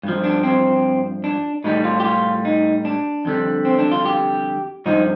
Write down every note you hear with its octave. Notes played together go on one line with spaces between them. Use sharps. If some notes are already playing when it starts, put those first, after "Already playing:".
G2 F3
D4
C4
D4
A2 G3 D#4
F4
G4
F4
D#4
D4
F2 D3 G3
C4
D4
F4
G4
G2 F3 D#4